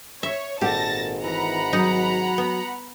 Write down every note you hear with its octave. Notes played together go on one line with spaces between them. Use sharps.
C#5 E5
G#1 A#2 G4 A4 F#5 A5 A6 A#6
E3 F#5 A#5 B5
F#3 D#4
B3